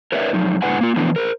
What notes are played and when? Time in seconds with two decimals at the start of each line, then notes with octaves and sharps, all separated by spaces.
0.12 A#4 B4 C#5 D5 E5
0.33 F2 F#3 D#4
0.62 G#2 D3 E4 B4 F#5 G#5
0.81 A#3 F4
0.96 E3 F3 A3 B3 D4 E4
1.16 A#4 C5